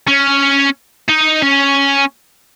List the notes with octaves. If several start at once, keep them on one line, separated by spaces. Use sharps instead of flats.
C#4
D#4
C#4